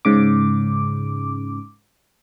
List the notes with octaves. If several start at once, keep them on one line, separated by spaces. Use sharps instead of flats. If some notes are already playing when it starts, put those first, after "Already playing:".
G#2 C#3 D6